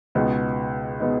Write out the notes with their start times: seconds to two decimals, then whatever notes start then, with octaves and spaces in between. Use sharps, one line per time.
0.15 C#2 B2 G#3 B3 D#4
1.00 B2 G#3 B3 D#4